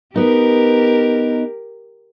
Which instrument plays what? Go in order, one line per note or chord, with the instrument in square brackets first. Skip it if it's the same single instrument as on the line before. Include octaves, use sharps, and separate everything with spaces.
[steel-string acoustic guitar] B3 D#4 [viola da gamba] G4 A#4